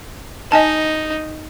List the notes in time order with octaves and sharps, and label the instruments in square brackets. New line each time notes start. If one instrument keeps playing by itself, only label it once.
[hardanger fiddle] D#4 [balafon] D#5 G#5 A5